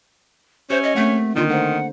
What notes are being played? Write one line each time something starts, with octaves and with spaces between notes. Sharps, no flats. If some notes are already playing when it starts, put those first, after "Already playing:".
C#4 G4 C5 E5
D#5
A3 A#3 C4 F#5
D3 D#3 A#3 D4 F4
A3 A#4 C5 F#5